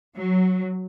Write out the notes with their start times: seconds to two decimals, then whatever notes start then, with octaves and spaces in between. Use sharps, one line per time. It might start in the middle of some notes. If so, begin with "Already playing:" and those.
0.17 F#3